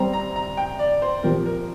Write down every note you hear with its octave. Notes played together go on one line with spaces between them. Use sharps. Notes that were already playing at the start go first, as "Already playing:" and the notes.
Already playing: G3 C4 G4 A#5
A#5
A#5
G5
D5
C5
A#2 F3 C4 G4 A#4
A#4